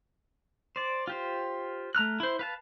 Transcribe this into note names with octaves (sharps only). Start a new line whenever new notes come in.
C5 D5
F4 G4 C5
A3 A#5 F6 F#6
E4 C5
B4 F5 A5